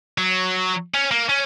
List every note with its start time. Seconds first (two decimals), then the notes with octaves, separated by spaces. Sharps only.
0.18 F#3
0.94 C#4
1.11 A#3
1.29 C#4